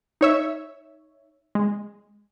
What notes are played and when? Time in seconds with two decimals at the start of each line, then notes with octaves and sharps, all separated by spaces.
0.21 D#4 C#5 E5
1.55 G#3